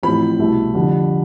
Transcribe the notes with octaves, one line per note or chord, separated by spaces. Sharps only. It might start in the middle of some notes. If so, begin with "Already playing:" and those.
A1 A2 F3 C4 B5
C2 B2 A3 E4
F2 D3 G3